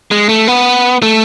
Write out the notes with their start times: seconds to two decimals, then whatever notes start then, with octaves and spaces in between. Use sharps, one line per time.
0.11 G#3
0.29 A3
0.48 B3
1.02 A3